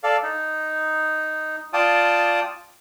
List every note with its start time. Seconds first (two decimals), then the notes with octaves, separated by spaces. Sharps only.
0.04 A4 D5 F5
0.23 D#4
1.73 F4 D5 G5 A5 D#6